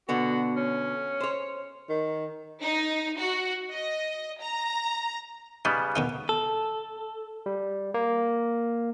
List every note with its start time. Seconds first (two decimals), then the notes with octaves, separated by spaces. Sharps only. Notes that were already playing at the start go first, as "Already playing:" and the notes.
0.09 B2 D3 B3 F#4
0.57 C#4
1.20 C5 C#5
1.90 D#3
2.62 D#4
3.19 F#4
3.70 D#5
4.41 A#5
5.65 C#3 G3 B3 D#4
5.96 B2 D#3 D#4
6.29 A4
7.46 G3
7.94 A#3